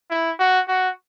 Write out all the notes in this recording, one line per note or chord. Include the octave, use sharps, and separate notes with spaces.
E4
F#4
F#4